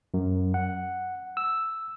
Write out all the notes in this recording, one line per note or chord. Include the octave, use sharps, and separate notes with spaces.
F#2
F#5
E6